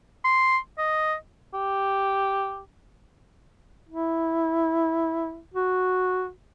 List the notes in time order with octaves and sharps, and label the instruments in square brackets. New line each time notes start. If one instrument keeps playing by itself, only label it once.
[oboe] C6
D#5
[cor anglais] G4
[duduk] E4
F#4